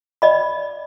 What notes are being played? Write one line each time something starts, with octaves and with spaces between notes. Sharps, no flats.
D5 D#5 B5